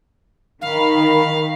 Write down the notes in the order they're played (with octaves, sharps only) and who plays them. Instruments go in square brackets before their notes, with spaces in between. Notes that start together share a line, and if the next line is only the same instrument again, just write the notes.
[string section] D#3 B5 [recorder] F5